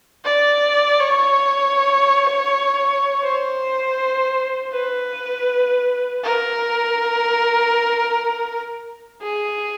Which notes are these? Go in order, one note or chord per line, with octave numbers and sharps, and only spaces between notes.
D5
C#5
C5
B4
A#4
G#4